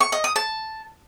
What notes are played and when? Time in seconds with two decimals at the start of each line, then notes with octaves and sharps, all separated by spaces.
0.01 C#6
0.12 D#5
0.24 D#6
0.36 A5